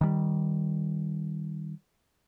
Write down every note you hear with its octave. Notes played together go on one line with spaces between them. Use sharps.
D#3 G3